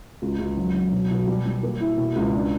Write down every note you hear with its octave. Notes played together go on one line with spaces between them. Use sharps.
C#2
C#2
F#3
F#3
B2
B2
G3
G3
A#3
E4
B2
C#2
D4